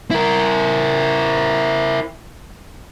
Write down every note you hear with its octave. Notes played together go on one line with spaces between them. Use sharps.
E4 A#4